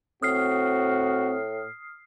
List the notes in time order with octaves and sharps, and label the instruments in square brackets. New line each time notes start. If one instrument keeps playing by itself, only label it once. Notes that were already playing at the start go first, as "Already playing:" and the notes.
[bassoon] A2 [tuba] C4 [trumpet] F#4 [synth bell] D#6 F6 C7